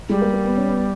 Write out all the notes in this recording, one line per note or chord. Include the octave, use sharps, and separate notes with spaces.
G3 G#3
A#3
A#3
B3
C#4
B3